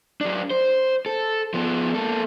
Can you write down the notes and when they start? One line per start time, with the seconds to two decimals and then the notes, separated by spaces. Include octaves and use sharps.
0.21 F#3 D4
0.50 C5
1.06 A4
1.54 F3 B3
1.94 A#3 A4